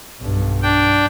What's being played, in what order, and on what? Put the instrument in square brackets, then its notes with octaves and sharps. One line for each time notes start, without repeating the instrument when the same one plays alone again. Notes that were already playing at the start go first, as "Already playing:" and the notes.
[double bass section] B1 G2
[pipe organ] D4 G5